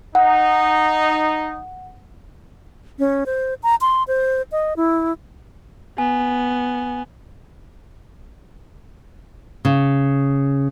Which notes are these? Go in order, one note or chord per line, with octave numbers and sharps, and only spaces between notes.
D#4 F#5
C#4
C5
A#5
C6
C5
D#5
E4
B3 G#5
C#3